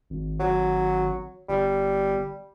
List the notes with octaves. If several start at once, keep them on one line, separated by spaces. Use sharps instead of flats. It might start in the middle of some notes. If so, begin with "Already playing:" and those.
G#1
F#3
G1 G3